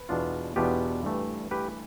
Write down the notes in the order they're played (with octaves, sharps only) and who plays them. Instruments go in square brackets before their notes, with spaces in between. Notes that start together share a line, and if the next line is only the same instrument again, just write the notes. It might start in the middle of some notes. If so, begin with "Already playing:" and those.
Already playing: [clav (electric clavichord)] B4
E2 B2 B3 D4 F4
E2 B2 B3 D4 F4 G4 B4
G2 E3 A3
G2 E3 A3 G4 B4